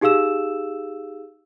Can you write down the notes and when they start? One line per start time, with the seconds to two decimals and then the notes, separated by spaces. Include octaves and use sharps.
0.01 D#4 G4 G#4 F5 E6 E7